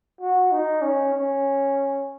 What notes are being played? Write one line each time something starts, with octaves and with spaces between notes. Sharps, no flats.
F#4
D#4
C#4
C#4